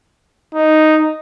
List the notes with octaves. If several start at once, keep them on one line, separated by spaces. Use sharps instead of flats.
D#4